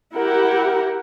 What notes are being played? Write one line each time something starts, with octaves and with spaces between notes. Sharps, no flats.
E4 G4 A#4 F#5